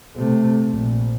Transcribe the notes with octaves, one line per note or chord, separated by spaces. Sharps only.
C3 A3
A#1